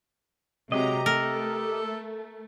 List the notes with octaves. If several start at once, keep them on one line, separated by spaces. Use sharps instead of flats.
C3 F#3 G#3 G4 D#5 A#5
A3 A4 A#4